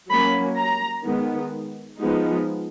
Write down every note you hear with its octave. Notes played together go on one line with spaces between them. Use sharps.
F#3 A#3 C#4 B5
A#5
D#3 G#3 B3
F3 G#3 B3 D#4